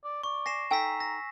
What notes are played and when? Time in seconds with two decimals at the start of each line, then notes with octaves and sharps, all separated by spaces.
0.04 D5
0.23 D5 C#6
0.46 G#5 A#6 C7 E7
0.71 D#4 A4 G5 G#5 A#5 E6 B6
1.00 A#6